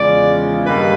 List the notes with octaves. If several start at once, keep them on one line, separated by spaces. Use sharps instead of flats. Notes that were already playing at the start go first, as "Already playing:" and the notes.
Already playing: E2 C#3 F3 G#3 D5
G2 D#3 G3 A#3 B4